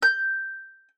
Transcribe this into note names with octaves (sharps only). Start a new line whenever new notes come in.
G6